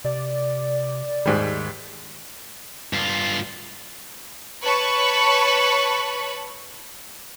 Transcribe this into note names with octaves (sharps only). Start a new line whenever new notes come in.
C3 D5
D#2 G#2 D#3 G3
G2 F4
B4 C#5 A5 B5 C#6